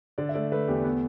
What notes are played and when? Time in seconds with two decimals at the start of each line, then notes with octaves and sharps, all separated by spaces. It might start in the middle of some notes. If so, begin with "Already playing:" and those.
0.18 D3 D5
0.29 E5
0.34 A3 D5
0.52 A3 B4
0.68 E2 G4
0.84 B3